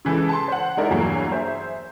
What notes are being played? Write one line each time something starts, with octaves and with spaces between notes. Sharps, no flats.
C#3 E3 G#3 A4 B4
A5 C6
C5 F#5
G#3 D#4 E4 A#4 D5
E2 G2 E3 F#3 A#3
G#4 C5 E5